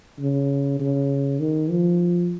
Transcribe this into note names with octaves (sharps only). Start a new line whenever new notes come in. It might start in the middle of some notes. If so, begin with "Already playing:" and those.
C#3
C#3
D#3
F3